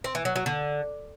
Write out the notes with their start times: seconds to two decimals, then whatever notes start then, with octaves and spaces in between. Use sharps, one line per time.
0.04 C4
0.15 E3
0.25 F#3
0.36 F#3
0.46 D3